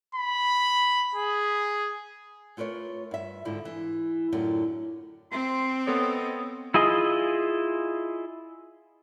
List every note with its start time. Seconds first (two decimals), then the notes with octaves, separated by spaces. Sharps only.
0.15 B5
1.15 G#4
2.57 A3 F4 A#4 B4 C#5
3.11 G2 E5
3.45 G#2 D3 E4 F4
3.65 E3
4.33 F#2 A2 D3 F#3 F4
5.32 C4 C6
5.87 B3 A4 C#5 D#5
6.74 E4 F4 G#4 D#5